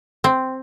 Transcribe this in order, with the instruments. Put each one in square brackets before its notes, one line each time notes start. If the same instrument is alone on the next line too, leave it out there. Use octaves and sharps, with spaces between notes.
[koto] C4